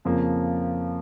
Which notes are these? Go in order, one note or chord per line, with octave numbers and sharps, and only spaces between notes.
F2 C#3 F3 A#3